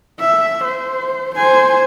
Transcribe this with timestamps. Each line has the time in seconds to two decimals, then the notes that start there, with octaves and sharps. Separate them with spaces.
0.20 E5
0.65 C5
1.35 C5 G#5